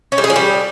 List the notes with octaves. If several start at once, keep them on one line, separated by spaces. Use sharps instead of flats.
C#4
G3
G#4
F3
G3